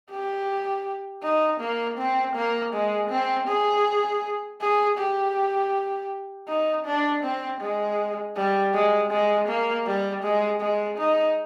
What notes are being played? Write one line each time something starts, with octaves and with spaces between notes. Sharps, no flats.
G4
D#4
A#3
C4
A#3
G#3
C4
G#4
G#4
G4
D#4
D4
C4
G#3
G3
G#3
G#3
A#3
G3
G#3
G#3
D#4